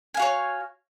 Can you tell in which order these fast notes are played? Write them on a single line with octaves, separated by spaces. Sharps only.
G#5 F5 F#4 C#5